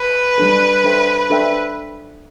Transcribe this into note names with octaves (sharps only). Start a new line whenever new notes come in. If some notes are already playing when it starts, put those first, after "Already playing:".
Already playing: B4
G3 D4 A4
D4 A4 C5 E5 G5
D4 A4 C5 E5 G5